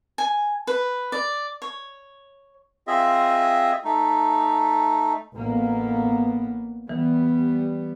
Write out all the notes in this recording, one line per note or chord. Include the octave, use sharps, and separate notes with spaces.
G#5
B4
D5
C#5
C4 F4 G#4 D#5 E5
A3 D#4
A1 A#3 B3
E3 G3 B3